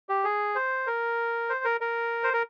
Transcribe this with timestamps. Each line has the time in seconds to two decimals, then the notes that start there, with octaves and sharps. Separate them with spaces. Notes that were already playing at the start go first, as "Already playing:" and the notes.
0.09 G4
0.24 G#4
0.55 C5
0.87 A#4
1.49 C5
1.64 A#4
1.81 A#4
2.24 C5
2.33 A#4